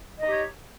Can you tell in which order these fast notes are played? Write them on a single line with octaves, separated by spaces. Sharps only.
D#5 D#4 G4 C#5